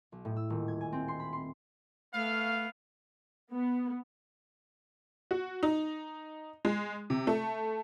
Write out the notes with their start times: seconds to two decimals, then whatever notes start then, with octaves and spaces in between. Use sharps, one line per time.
0.12 B1
0.25 A2
0.36 E6
0.50 D#1
0.68 G#6
0.81 G#5
0.92 C4
1.08 C6
1.20 B5
1.33 C6
2.14 A3 B3 F5
3.52 B3
5.31 F#4
5.63 D#4
6.65 G#3
7.10 C3
7.27 A3